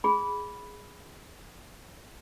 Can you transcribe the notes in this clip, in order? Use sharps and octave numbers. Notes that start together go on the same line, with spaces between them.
G#4 B5